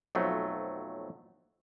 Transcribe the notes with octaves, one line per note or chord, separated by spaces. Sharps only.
B1 F2 F3 F#3 A3